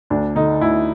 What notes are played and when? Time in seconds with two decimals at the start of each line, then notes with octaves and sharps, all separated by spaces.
0.10 D2 D4
0.36 D3 D#4
0.61 D2 E4